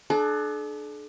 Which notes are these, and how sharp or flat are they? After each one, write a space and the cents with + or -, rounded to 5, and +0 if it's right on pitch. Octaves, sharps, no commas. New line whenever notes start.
D4 +25 A4 -45